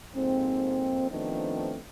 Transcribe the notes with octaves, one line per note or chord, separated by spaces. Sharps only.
F2 G#2 A#3 C4
D#3 F3 A3 B3 C4 D4